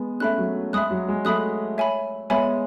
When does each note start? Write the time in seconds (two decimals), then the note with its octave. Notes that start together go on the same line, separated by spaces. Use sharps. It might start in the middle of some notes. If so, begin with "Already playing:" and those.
Already playing: G#3 B3
0.20 A3 C#4 E5 B5 F#6
0.38 F#3
0.73 G#3 E5 B5 D#6 F#6
0.91 F#3
1.08 G#3
1.25 F#3 A3 E5 B5 D#6 F#6
1.78 C#5 E5 G#5 B5
2.30 G#3 B3 C#5 E5 G#5 B5